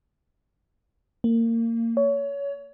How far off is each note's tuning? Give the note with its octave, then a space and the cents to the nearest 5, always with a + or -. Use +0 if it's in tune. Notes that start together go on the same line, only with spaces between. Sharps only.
A#3 -25
C#5 +25